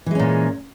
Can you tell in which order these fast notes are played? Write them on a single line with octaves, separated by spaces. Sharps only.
E3 G#3 C#4 A#2